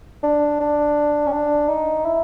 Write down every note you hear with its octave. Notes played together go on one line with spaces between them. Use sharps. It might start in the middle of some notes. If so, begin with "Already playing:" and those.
D4
D4
C#4
D4
D#4
E4